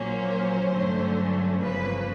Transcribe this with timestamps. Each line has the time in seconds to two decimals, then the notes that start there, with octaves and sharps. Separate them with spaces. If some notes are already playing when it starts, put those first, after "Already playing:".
Already playing: A#1 A#2 F#3 A#3 C#4 C5
0.71 G2 D3 F#3 A3 C#4
1.61 G1 F2 C#3 F3 A#3 B4